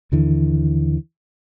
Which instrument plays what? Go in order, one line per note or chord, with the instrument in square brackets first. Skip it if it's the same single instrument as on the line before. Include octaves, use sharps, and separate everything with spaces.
[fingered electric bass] D#2 D3 E3